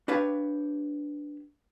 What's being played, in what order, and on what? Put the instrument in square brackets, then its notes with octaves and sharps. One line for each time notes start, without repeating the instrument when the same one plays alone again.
[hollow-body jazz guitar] D4 G4 B4 C#5 F5